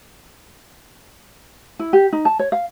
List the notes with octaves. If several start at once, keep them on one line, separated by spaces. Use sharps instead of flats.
E4
G4
D#4
A5
C#5
F5